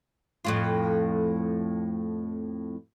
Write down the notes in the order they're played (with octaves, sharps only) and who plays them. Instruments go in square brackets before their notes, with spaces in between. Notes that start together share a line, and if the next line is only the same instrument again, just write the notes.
[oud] F2 A2 F4